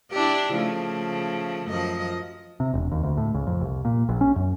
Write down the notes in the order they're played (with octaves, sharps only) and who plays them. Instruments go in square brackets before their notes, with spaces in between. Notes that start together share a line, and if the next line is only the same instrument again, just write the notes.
[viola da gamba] D4 E4 G4
C#3 F3 A3
F#2 F3 D#5
[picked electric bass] C3
E1
D#2
D2
A2
C#2
F2
C2
A#2
A#1
C#4
F#2